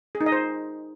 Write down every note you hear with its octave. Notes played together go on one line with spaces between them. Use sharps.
G#4
D#4
D#5
C5